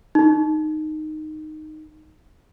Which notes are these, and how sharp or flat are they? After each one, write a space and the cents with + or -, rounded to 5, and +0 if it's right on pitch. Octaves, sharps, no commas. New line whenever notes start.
D#4 -10